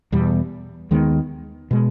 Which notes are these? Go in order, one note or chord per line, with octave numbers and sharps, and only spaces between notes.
E2 B2 G3
D#2 D#3 G#3 B3
B2 G#3